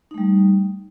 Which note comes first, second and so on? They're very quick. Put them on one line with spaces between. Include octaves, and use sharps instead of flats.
D#4 A3 G3